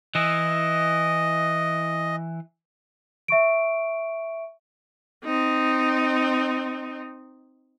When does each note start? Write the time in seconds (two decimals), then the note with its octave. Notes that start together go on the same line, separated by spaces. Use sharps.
0.15 E3 E4 D#5
3.28 E5 C#6 D7
5.25 C4 D#4